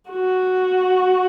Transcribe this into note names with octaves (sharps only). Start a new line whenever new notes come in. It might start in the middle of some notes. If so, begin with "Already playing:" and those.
F#4